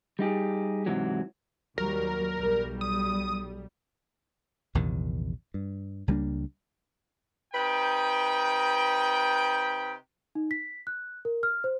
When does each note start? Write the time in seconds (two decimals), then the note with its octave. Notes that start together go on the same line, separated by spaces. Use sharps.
0.19 G3 D#4 G4 G#4
0.86 G#2 C3 E3 F#3
1.78 D#2 F#3 G3 A#4
2.39 B1 G3
2.81 D#6
4.75 A#1 E2 C3 D#3
5.54 G2
6.08 C#2 G3 A#3 D4
7.53 C3 D#4 B4 G5
10.35 D#4
10.51 B6
10.87 F#6
11.25 A#4
11.43 F6
11.64 C5